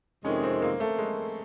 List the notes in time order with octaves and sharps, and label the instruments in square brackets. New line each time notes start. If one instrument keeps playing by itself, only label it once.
[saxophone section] F2 C3 D#3 G#3 [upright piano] C#4
[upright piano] C4
A#3
A3
G#3